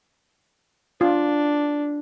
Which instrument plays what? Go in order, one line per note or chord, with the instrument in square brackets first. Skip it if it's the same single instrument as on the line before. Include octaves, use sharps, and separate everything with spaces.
[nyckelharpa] D4 [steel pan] F4